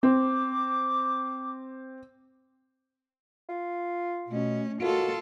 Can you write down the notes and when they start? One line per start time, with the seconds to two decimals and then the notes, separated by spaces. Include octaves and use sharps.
0.03 C4 D6
3.49 F4
4.28 B2 A3 C#4
4.81 D#2 F4 F#4 A4